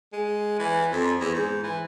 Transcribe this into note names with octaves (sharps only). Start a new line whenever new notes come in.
G#3
E3
F2
E2
G#2
E3